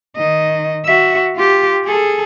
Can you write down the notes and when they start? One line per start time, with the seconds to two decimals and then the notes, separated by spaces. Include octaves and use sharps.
0.16 D#3 D#5
0.85 F#4 E5
1.36 F4 G4
1.84 G#4 A4